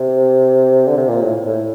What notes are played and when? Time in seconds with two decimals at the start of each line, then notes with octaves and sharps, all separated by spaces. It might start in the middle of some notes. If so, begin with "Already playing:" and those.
Already playing: C3
0.87 D3
0.97 C3
1.08 A#2
1.22 A2
1.46 A2